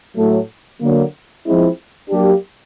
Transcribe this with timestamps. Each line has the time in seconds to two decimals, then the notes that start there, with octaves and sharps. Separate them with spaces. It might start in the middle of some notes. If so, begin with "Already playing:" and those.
0.16 A2 F#3 A3
0.80 D3 F#3 A#3
1.45 F3 G#3 C4 E4
2.10 F#3 A#3 D4 G4